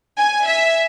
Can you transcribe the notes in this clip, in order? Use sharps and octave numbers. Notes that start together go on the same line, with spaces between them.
G#5
E5